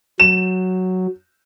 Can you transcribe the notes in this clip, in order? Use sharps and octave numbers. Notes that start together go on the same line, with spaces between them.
F#3 E7